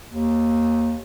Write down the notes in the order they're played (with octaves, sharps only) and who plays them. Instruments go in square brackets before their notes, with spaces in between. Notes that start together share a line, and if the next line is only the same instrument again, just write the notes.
[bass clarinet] D#2